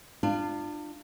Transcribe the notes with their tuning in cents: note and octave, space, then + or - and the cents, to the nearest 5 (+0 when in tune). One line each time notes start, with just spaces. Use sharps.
D4 +30 F4 -10